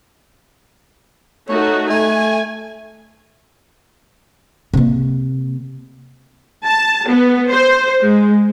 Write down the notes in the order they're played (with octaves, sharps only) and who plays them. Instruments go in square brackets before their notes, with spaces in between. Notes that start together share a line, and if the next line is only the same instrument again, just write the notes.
[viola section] A3 D#4 F#4 [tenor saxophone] C#5
[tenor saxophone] A3 [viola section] G#5
[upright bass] C3 A#3
[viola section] A5
B3
C5
G#3